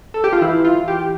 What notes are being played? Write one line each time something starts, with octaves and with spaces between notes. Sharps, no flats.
A4
G4
F4
E3 E4
F4
E3
G4